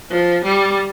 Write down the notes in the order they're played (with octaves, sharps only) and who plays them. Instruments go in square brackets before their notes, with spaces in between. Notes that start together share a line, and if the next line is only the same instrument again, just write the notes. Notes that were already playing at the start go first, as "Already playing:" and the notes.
[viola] F3
G3